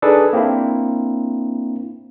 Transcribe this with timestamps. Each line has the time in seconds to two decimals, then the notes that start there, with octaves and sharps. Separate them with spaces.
0.02 D4 D#4 G#4 A4 B4 D5
0.33 A#3 C4 D4 E4